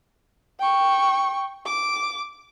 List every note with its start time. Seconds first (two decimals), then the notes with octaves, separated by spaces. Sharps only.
0.60 G5 C#6
1.66 D6